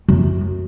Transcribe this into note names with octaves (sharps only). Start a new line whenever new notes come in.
F#2